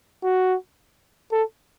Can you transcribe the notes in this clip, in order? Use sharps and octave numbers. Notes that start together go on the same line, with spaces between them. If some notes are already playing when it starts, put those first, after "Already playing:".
F#4
A4